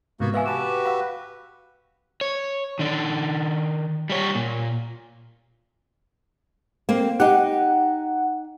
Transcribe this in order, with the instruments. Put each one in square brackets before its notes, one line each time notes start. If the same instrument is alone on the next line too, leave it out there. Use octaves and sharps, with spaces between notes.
[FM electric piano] G#2 C3 [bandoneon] A#3 B3 F#4
[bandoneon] E3 B3 [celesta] B4 F5 G#5 [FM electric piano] E5 C#6 E6
[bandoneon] F#4 G4 B4 [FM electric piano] A5 D6 [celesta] E7
[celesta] F5 F#5 [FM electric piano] B5 E6
[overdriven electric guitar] C#5
D#3 D4
G3 C#5
A#2
[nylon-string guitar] A#3 C4
[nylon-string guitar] D#4 G4 [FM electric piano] F#5